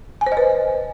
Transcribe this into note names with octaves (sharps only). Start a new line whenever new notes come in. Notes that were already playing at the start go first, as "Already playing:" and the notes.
G#5
C5
D#5
B4